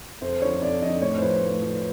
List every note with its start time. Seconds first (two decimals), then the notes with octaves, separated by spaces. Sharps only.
0.21 F2 C5
0.42 D3 F3 C#5
0.61 F2 D5
0.82 D3 F3 D#5
1.01 A2 C#5
1.18 C5
1.22 F3 B4
1.42 A2
1.62 F3